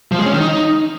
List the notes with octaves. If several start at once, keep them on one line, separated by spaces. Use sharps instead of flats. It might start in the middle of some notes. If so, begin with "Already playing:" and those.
F3
G#3
C#4
D#3
D#4